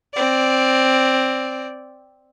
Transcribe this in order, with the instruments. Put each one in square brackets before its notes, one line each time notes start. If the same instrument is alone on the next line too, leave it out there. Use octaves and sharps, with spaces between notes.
[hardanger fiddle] C4 D5